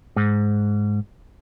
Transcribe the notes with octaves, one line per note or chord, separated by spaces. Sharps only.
G#2